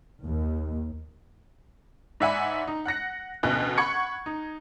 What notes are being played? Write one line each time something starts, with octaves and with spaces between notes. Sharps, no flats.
D#2
G#2 D5 E5 F#5 G#5 B5
D#4
F#5 F#6 A#6 C#7
A1 D2 B2 F#6
F#5 B5 C#6 G#6 C#7
D#4